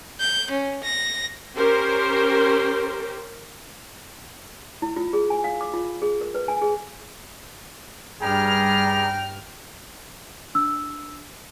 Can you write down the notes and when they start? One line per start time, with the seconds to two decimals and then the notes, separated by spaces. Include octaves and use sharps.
0.21 G6
0.51 C#4
0.84 A#6
1.56 C#4 G4 A#4 C5
4.82 E4
4.96 F4
5.13 G#4
5.30 G#5
5.44 F5
5.61 D6
5.73 F4
6.02 G#4
6.21 A#4
6.34 B4
6.48 G#5
6.61 G#4
8.22 G2 G3 G#4 G5 A#5 F6
10.55 D4 E6